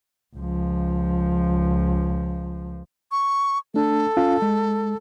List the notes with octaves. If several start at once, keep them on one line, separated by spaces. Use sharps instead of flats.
C#2 F3
C#6
A3 D4 A4
C#4 F4 F5
G#3